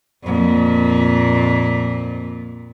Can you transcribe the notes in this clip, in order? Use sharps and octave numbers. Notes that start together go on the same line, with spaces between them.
F2 A#2